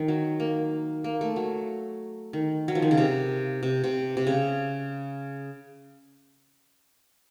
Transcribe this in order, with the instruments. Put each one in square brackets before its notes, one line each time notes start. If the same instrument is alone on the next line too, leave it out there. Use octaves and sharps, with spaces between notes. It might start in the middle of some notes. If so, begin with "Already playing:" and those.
Already playing: [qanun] D#3
F#3
A#3
A#3
A3
F#3
D#3
F#3
F3
D#3
C#3
C3
C3
C3
C3
C#3